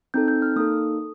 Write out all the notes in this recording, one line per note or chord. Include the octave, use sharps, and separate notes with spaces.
C4 D#4 A4 G6
G6
F6
A#3 D#4 A4 D#6
A4